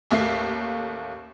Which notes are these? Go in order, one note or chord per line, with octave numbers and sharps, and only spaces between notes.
A1 D#2 A3 A#3 G4 C7